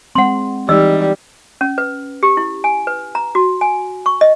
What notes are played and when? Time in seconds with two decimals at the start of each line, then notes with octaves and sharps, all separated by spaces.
0.15 G#3 C4 F#5 C6
0.69 E3 G3 G#3 D#4 D#5 E6
1.61 C#4
1.78 B4
2.23 G4
2.37 E4
2.64 G#5
2.87 B4
3.15 A#5
3.35 F#4
3.61 G#5
4.06 C#6
4.21 D#5